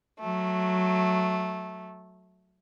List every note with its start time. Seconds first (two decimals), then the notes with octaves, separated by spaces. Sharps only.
0.20 F#3 A3